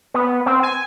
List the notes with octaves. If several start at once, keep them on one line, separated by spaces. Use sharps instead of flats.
B3
C4
G#5